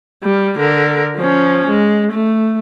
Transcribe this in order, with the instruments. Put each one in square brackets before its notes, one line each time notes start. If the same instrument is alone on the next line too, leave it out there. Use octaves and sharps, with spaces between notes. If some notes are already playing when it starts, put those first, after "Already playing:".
[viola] G3
D3 A#4
F3 C#4
G#3
A3